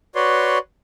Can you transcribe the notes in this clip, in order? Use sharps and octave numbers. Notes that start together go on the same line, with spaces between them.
F#4 B4 C#5 D5 C6